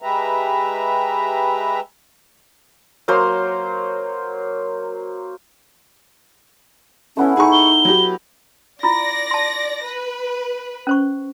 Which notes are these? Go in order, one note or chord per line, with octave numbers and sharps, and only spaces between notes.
G#3 G4 B4 E5 A#5
F#3 A#3 C5 C6
A3 B3 C#4 E4
D#4 G#4 C#6
G7
F#3 G4
E4 F4 D5 A#6
A5 C6
B4
C#4 C5 C#6